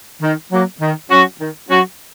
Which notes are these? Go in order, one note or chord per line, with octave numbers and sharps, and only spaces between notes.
D#3
F#3 A#3
D#3
F#3 C#4 F#4
D#3
F#3 C#4 F#4